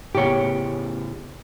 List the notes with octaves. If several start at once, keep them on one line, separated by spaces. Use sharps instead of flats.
A2 C#3 B3 G4 C#5